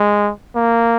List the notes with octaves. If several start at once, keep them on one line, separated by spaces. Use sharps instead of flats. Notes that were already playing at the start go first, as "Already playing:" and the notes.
Already playing: G#3
A#3